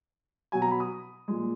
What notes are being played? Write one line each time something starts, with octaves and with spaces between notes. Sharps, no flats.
B2 F#3 G#5
A#5
B5
D#6
A#2 F3 G#3